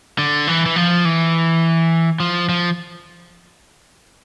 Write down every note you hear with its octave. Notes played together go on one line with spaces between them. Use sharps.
D3
E3
E3
F3
E3
F3
F3